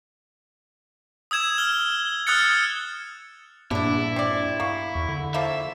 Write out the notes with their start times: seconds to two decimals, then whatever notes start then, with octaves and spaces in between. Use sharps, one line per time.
1.31 D#6 E6 G#6 E7
1.58 F6 G7
2.27 D#6 F6 F#6 G#6 A6 C#7
3.71 A#1 G2 D3 D4 E4
4.16 C4 D5
4.60 A#3 C#6
4.95 E2
5.09 D3
5.34 F3 A#3 E4 E5